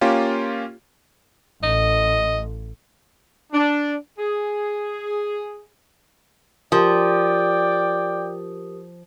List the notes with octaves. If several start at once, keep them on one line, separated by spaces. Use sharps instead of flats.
A#3 C#4 F4 G4
A1 D#5
D4
G#4
F3 G4 A#4 D5 G5 D#6